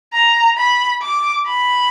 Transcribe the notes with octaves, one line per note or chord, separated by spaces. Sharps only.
A#5
B5
D6
B5